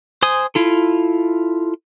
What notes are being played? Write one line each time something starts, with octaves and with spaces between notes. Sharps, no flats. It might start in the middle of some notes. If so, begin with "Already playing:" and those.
C5 G#5 D#6
E4 F4 A4